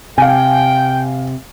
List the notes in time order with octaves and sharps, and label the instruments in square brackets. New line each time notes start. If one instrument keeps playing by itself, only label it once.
[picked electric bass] C3 [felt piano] F5 G#5 [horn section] G5